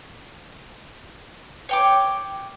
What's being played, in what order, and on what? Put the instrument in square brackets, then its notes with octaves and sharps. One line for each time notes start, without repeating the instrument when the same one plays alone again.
[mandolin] C#5 G5 D6